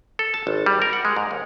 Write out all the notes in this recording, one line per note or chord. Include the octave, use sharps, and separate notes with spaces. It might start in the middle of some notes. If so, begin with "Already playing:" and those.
A4
A5
G#1
G3
A#4
F#5
G#3
G#2
D#2